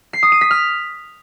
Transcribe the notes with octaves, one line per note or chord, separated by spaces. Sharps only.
C7
D#6
D#7
B6
F6